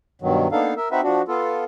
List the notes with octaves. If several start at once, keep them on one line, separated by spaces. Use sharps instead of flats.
G2 B2 D#3 F#3
A#3 B3 D4 D#4 A4 F5
A#4 E5
C4 D#4 F#4 B4 E5
F3 D4 F#4
B3 F4 A4